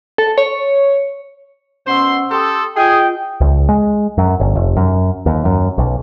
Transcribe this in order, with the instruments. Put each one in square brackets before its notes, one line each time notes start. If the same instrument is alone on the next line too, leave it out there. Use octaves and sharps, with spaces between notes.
[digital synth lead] A4
C#5
[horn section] B2 C5 C6 [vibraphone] C#4 F#5 E6
[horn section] G4 A4 [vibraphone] C6 D#6
[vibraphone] F4 [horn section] G#4 [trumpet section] D#5 G5
[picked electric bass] C#2
G#3
F#2
G1
F1
F#2
D#2
F#2
B1